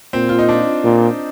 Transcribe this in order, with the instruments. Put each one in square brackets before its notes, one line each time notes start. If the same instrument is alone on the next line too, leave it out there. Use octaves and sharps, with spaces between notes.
[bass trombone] A#2 [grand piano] C4
[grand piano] F4
D#4
D4
[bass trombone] A#2